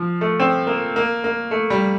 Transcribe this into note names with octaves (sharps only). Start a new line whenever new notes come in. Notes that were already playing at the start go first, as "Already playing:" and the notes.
Already playing: F3
A3
C4
A#3
A#3
A#3
A3
G3